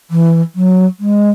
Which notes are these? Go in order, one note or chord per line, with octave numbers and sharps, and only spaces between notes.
E3
F#3
G#3